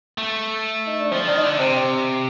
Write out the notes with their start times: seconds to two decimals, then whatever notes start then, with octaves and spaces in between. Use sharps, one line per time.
0.18 A3
0.87 D#4
1.00 D4
1.12 F3 C4
1.27 D#3 D4
1.37 D#4
1.43 D3 D4
1.59 C3 C4